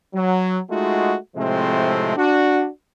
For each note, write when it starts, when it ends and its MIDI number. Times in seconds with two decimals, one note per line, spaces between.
0.14 0.59 54
0.70 1.16 56
0.70 1.16 57
0.70 1.16 63
0.70 1.16 65
0.70 1.16 66
1.37 2.15 45
1.37 2.15 48
1.37 2.15 53
1.37 2.15 56
1.37 2.15 57
1.37 2.15 60
2.17 2.67 62
2.17 2.67 66